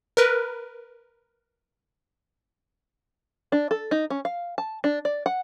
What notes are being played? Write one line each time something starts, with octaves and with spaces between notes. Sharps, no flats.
A#4 B4
D4
A4
D#4
C#4
F5
A5
D4
D5
F#5